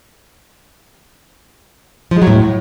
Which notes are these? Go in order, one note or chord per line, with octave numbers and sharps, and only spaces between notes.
F3
G#3
F#3
A2